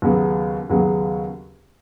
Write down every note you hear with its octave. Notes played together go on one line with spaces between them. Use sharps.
D#2 C#3 F#3 B3 G#4
D#2 C#3 F#3 B3 G#4